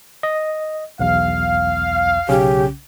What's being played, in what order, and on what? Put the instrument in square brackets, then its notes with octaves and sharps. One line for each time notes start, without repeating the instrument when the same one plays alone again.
[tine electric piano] D#5
[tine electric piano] B1 E2 [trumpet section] F5
[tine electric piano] B1 C#3 C#4 [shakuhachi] G4